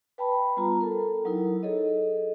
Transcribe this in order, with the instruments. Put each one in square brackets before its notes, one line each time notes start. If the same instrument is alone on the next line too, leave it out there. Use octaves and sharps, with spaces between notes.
[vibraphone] B4 G5 A5 B5
G3 B3 F4 A#5
A4 A#4
F#3 D#4 E4 A#4
G#4 A4 C#5 D#5